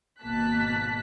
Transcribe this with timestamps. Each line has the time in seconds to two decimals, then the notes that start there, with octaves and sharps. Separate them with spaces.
0.21 G#1 B2 A#3 A5 F#6 B6